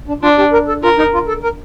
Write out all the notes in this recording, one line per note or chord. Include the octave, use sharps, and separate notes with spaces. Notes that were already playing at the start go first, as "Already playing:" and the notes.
D4
D4 F4
G4
A#4
A4
F4 A#4
D#4
F4
A4
A#4